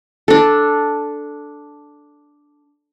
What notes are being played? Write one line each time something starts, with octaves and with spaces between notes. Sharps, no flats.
D4 A4